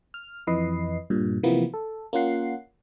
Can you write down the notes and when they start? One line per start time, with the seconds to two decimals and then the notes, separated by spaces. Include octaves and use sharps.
0.14 F6
0.47 F2 E3 B4 D#5 C7
1.10 G2 A#2
1.43 C3 E3 F3 A#3 B3
1.74 A4
2.13 A#3 C#4 F4 F#5 C7